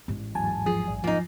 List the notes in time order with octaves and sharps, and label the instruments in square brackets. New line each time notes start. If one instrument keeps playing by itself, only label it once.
[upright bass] A1 G#2
[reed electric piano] E2 F#3 G#5 [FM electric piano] A5
[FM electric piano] F3 [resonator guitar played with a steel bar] G#4
[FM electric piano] A#1
[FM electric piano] F3 [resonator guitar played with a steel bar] A#3 D#4